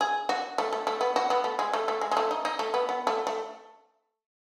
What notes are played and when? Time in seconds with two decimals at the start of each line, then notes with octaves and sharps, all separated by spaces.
0.01 G#4
0.29 F#4
0.58 A3
0.73 A3
0.87 A3
1.01 B3
1.16 F#4
1.30 B3
1.44 A3
1.59 G#3
1.73 A3
1.88 A3
2.01 G#3
2.11 G#3
2.17 A3
2.31 D#4
2.45 D#4
2.59 A3
2.74 B3
2.89 B3
3.07 A3
3.27 A3